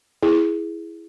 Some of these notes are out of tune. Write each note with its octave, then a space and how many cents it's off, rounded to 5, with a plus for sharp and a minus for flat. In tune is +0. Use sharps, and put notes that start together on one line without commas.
E4 +5 G#4 +0